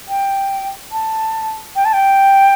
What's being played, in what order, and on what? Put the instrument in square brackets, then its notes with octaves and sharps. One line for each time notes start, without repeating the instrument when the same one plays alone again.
[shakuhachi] G5
A5
G5
A5
G5